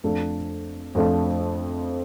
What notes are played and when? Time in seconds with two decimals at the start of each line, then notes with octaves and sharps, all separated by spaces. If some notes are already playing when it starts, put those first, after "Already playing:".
0.04 F2 F3 A3 D4 A4
0.95 F2 F3 A3 D4 A4